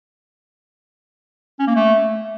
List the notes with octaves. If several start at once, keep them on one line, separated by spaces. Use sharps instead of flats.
C#4
A#3
A3